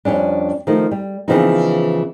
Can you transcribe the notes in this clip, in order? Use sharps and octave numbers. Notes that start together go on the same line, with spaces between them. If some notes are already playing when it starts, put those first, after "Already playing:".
F2 G3 A3 C#4 D4
D#3 F3 A3 D#4
G3
C#3 E3 F3 B3 C4 D#4